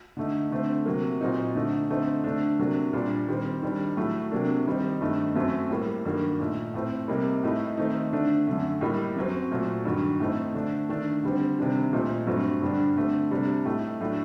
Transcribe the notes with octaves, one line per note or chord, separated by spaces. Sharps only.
D3 A3 D#4
D3 A3 C4
C3 F#3 A#3
A#2 F#3 C4 D#4
D3 A3 D#4
D3 A3 C4 D#4
D3 A3 D4
C3 F#3 A#3 D4
A#2 G3 D4
D#3 G3 C4
D#3 G3 D4
A2 F#3 A3
C3 F#3 A#3 D4
D#3 G3 C4 D#4
G2 D#3 A3 D#4
F#2 F#3 A3 C4
A2 G3 A#3
G2 D#3 F#3 A#3
A#2 A3 D#4
A2 A3 C4
C3 G3 A#3 D#4
A2 A3 D#4
D#3 A3 C4 D#4
D3 A3 D4
F#2 D3 A3
A2 G3 A#3 D#4
F#2 F#3 C4
A#2 F#3 A3
G2 D#3 F#3
A2 A3 C4 D#4
D3 A3 D4
D#3 A3 D4
D3 G3 C4
C3 D#3 G3 D4
A#2 A3 C4 D#4
G2 F#3 A3 C4
G2 D3 G3 D4
D3 A3 C4
C3 G3 D4
A2 A3 D#4
A2 F#3 A3 D4